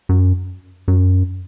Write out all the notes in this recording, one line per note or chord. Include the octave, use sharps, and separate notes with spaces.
F#2
F#2